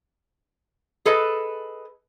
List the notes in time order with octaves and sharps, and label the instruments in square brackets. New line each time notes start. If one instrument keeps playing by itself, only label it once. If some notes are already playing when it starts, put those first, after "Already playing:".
[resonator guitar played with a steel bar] G#4 A4 B4 D#5